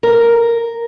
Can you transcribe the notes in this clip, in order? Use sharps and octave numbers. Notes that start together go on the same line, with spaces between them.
A#4